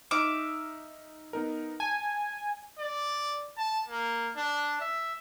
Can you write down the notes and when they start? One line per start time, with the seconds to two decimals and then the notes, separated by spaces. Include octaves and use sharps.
0.11 D#4 E5 D6 D#6 F6
1.33 B3 D#4 A#4
1.80 G#5 A5
2.79 D5
3.58 A5
3.89 A#3
4.37 D4
4.81 E5